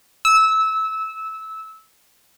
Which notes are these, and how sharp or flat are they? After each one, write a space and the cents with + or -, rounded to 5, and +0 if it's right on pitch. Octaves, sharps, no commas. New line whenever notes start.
E6 -20